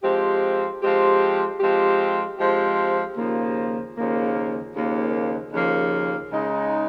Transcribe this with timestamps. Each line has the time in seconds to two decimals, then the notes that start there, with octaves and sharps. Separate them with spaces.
0.03 F3 G#3 C4 G4
0.82 F3 G#3 C4 G4
1.60 F3 G#3 C4 G4
2.39 F3 G#3 C4 G4
3.17 D#2 C#3 F3 A#3
3.97 D#2 C#3 F3 A#3
4.75 D#2 C#3 F3 A#3
5.53 D#2 C#3 F3 A#3
6.31 C#3 G#3 D#4